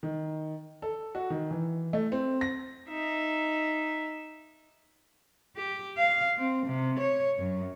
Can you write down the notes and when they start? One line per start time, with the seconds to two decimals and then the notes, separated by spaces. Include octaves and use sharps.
0.03 D#3
0.82 A4
1.15 F#4
1.30 D#3
1.51 E3
1.93 A3
2.12 C4
2.41 A#6
2.89 D#4 E5
5.56 G4
5.97 F5
6.38 C4
6.66 C3
7.00 C#5
7.38 F#2